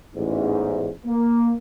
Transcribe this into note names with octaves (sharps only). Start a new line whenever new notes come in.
A1 E2 G#2
A#3